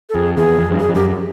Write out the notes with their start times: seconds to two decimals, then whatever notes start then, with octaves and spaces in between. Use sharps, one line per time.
0.09 A4
0.15 F2 G#4
0.37 E2 G#4
0.59 F2
0.71 G2
0.80 F#2 G#4
0.89 F2
0.95 F#2 G4